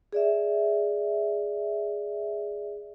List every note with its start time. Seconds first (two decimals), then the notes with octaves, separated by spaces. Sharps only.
0.13 G#4 D5 E5